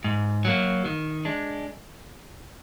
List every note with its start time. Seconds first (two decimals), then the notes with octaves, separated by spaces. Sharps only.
0.04 G#2
0.45 F#3 A#3
0.85 D#3
1.25 G#3 D4